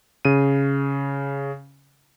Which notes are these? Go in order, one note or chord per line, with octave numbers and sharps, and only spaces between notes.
C#3 D#7